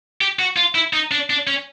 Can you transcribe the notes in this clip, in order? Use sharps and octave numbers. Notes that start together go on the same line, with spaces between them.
G4
F#4
F4
E4
D#4
D4
D4
C#4